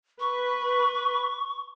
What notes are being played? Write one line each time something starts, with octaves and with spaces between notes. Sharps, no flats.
B4 C#6